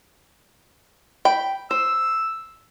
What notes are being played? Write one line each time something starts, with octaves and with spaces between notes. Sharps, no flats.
G5 B5
C5 E6